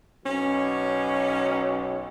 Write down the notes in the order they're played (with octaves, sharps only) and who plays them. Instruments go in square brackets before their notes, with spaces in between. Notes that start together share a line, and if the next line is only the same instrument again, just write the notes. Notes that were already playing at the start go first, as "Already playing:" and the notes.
[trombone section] B1 [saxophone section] C#4